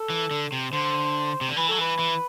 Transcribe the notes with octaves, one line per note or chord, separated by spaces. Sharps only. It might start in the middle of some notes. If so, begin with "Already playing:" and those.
Already playing: A4
E3
D3
C3
D3 C5
C3
D3
E3 B4
F#3 A4
E3 B4
E3